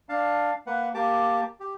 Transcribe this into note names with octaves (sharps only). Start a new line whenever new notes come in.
D4 F5 A5
A#3 B4 F#5
A#3 G4 A5 D6
G4